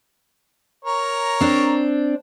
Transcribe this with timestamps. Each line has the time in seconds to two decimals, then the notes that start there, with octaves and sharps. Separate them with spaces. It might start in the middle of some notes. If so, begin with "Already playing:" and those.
0.85 A#4 C#5 A#5
1.41 C4 D4